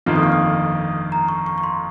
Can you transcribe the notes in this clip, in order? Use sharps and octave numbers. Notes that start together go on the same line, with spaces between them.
G1 F2 D#3 A#3 F4 F6
D#6
C#6
D#6
A#5
C#6
C#6
C#6
C6